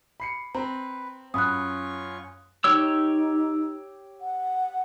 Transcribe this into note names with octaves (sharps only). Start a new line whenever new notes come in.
B5 C7 C#7
C4 B4 A#5
F#2 C#4 F4 B5 C#6 D#6 F#6
D#4 G4 C#5 E6
F#5